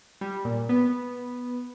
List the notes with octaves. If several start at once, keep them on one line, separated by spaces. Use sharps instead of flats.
G3
A#2
B3